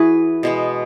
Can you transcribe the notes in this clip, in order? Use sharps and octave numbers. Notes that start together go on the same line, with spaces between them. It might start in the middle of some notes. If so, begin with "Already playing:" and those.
Already playing: E3 E4 F#4 G#4 B4
B2 G#3 B3